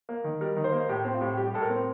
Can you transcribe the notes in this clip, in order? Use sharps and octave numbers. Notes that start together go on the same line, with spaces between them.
A#3
D#3
G3 A#4
D#3
C5
A#3
A2 G4
C4
F4
A2 G4
G3 G4
G4
A2 A4
A#4
C4